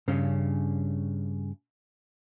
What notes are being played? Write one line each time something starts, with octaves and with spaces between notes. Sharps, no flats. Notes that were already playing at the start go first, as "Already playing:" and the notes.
G2 C#3 C#4